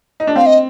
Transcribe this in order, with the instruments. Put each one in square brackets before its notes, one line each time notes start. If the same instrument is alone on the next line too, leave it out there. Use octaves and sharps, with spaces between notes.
[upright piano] D#4
D4
[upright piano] C4 [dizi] F5
[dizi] D#5